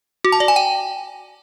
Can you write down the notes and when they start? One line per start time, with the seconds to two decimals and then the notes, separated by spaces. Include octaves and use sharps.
0.25 F#4
0.32 A5
0.40 D5
0.48 G#5
0.56 G5